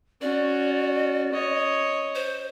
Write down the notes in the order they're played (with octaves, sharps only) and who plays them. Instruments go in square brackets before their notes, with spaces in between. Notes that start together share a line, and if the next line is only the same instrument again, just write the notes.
[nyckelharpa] C#4 F#4 [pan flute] D5
[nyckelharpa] C#5 D#5
[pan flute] C5